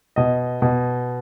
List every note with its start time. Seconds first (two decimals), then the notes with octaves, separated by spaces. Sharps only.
0.16 B2 D#5
0.62 B2